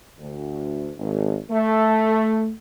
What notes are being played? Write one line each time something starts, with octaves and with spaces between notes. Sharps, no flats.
D2
G#1
A3